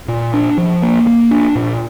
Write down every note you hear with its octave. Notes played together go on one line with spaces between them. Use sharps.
A#2
D4
F3
A#3
A#3
D4
A#2